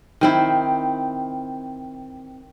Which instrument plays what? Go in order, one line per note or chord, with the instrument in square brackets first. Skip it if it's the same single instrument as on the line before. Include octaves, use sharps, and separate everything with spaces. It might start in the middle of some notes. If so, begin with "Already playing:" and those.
[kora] D#3 C4 E4